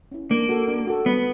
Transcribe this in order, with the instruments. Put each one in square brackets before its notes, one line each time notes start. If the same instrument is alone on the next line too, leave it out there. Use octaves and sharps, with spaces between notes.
[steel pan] C#4 E4
[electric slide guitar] A#3 [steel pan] D4
[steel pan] F#4 A4
D4
F#4 A4
[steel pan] G3 [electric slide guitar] B3